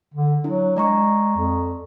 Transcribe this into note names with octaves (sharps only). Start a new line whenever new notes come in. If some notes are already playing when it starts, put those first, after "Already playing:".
D3
F#3 D4 E4
G#3 D5 A#5 C#6
F2